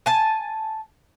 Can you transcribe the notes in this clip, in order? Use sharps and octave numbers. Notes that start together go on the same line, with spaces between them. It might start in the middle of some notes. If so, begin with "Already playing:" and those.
G#5 A5